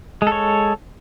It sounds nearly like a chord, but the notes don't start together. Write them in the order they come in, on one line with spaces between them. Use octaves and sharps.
G#3 A4 C#5